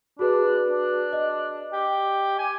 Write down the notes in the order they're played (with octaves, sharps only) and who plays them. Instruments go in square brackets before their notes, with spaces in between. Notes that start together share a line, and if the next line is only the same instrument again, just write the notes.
[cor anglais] D4 [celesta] F#4 G#4 B4
[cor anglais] D4
[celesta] D#5
[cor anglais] G4
G#5